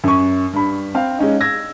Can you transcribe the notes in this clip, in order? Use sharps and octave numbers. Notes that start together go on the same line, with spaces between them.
F#2 C#6
G2 B5
C4 F5
G#3 C#4 D#4
E6 G#6 A#6